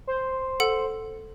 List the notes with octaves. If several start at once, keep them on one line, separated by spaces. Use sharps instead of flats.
C5
A4 F#5